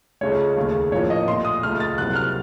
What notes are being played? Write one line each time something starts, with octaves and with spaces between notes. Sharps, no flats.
C#2 C#3 A3 C#5
D#2 C#3 A3
A2 F3 A#3 C#5
D#5
A#2 A3 C6
D#6
C#2 C#3 A3 F6
A6
C2 C3 F#3 A#3 F#6
F6